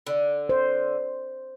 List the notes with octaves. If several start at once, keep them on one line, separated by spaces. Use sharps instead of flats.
D3
C5